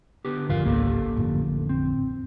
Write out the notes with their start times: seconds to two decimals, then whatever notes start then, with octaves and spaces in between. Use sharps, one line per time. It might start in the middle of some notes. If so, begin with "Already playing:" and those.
0.25 D3 B3 G4
0.49 A1 F2 D3 F4 A#4 F5
0.65 G#1 C#2 A#3 G4 A4
1.17 A1 F2 D3
1.69 C4